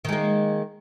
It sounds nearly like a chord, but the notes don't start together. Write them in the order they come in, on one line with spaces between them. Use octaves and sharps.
D#3 G#3 A#3